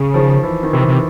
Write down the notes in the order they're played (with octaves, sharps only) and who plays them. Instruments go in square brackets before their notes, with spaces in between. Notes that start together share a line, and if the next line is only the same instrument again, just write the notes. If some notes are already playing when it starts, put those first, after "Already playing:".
Already playing: [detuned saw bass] C#3
[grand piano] D#3 F3
E3
D#3
[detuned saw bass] C3 [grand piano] E3
[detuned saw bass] C3